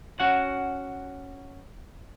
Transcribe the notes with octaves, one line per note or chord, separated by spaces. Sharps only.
C#4 F#4 F#5